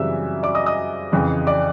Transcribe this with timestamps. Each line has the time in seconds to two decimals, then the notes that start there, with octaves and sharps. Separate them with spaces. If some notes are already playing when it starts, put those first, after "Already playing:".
Already playing: F#2 C#3 E3 G3 C4 E5 E6
0.43 D5 D6
0.55 D#5 D#6
0.66 D#5 D#6
1.12 F2 C#3 E3
1.47 D5 D6